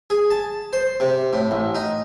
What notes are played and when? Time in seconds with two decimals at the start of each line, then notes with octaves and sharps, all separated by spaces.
0.10 G#4
0.30 A5
0.73 C5
1.00 C3
1.33 A2
1.51 A1
1.75 D#4